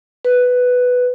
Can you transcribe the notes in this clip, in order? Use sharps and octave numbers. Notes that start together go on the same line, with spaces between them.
B4